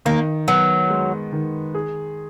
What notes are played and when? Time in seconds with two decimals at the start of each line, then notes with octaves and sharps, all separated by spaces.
0.05 D#3 A#3
0.48 F#3 B3
0.90 G#3
1.33 D#3
1.75 G#4